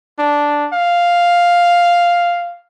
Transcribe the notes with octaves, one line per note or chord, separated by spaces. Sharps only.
D4
F5